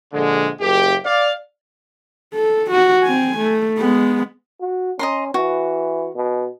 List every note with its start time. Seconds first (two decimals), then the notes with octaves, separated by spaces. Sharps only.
0.13 A#1 D3 G#3
0.60 F#1 G4
1.05 D5 F5
2.34 A4
2.71 F#4
3.03 C4 G#5
3.37 A3
3.78 G#3 B3
4.61 F#4
4.99 C#4 D#5 A#5 C6
5.34 E3 F#4
6.15 B2